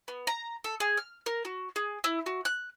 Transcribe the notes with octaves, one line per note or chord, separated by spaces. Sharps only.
B3
A#5
A4
G#4
F6
A#4
F#4
G#4
E4
F#4
F#6